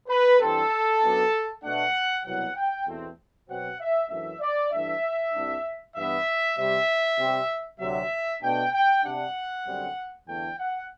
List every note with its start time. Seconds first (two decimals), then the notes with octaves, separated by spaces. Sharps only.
0.08 B4
0.40 G2 E3 G3 C4 A4
1.01 F#2 F#3 B3 D4
1.62 B2 A3 D4 F#5
2.24 C2 B2 F#3 F#5
2.55 G5
2.87 E2 B2 A3 C4
3.48 B2 F#3 C4 F#5
3.79 E5
4.09 F#2 E3 A3 D4 E5
4.40 D5
4.72 G2 E3 A3 D4 E5
5.34 C2 C3 G3 D4
5.95 G2 E3 B3 E5
6.56 C3 G3 C4 E5
7.18 C3 G3 C4
7.80 D2 C3 F#3 E5
8.42 B2 A3 D4 G5
8.72 G5
9.03 C3 G3 D4 F#5
9.65 F#2 D3 G3 C4
10.26 E2 D3 A3 D4 G5
10.58 F#5